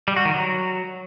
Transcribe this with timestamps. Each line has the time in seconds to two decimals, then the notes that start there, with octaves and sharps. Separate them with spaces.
0.08 G3
0.16 F#4
0.25 D#3
0.34 F#3